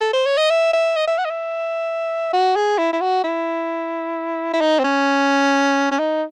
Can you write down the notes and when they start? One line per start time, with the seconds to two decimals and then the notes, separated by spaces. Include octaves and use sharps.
0.01 A4
0.13 C5
0.26 C#5
0.37 D#5
0.50 E5
0.73 E5
0.96 D#5
1.08 E5
1.19 F#5
1.25 D#5
1.30 E5
2.33 F#4
2.56 G#4
2.78 E4
2.93 E4
3.01 F#4
3.24 E4
4.53 E4
4.61 D#4
4.79 C4
4.84 C#4
5.91 C#4
5.99 D#4